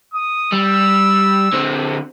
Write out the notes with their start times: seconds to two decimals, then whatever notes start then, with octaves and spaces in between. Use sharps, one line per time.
0.14 D#6
0.53 G3 E6
1.53 D3 C4